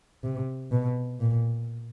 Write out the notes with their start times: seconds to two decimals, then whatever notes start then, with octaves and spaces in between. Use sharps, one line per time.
0.24 C3
0.72 B2
1.20 A#2